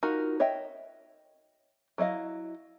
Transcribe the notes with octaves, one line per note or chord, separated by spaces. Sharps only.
D#4 F4 F#4 A#4
C#5 D#5 E5 G5
F#3 E4 D#5 F5